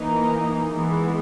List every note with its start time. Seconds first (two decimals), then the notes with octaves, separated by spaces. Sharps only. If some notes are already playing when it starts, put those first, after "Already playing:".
Already playing: E3 A#3 D#4
0.70 E3 G#3 B3